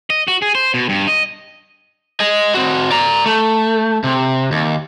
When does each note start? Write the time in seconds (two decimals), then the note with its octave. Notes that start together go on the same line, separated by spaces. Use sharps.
0.10 D#5
0.28 F#4
0.42 G#4
0.55 C5
0.74 B2
0.89 G2
1.07 D#5
2.20 D#5 G#5
2.54 C4 F#4
2.90 D5 A#5
3.26 A3
4.04 C3
4.52 D#2